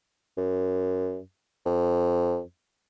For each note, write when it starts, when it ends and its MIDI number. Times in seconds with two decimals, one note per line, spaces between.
0.37 1.20 42
1.66 2.41 41